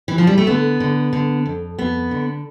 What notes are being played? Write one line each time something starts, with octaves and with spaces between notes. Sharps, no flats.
E3
F3
G3
A3
D3 B3
D3
D3
F2
F2 B3
D3